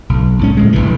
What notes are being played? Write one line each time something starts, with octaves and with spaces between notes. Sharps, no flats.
B1
B1 G#2 C#4
C#2 A2 G#3
F1 A#1 G2 E3